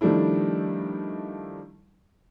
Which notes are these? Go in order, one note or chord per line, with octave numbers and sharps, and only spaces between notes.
D#3 F3 G3 A3 D4 E4